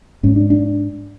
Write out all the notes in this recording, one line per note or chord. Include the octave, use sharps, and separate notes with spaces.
G#2 C#4
D4
D4